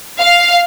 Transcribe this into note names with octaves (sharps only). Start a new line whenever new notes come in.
F5